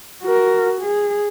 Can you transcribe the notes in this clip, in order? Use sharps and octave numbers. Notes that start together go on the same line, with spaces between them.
F#4 A#4
G#4